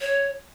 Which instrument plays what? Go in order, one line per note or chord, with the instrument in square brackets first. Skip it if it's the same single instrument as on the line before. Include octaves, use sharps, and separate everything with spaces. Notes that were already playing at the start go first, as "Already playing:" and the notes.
[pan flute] C#5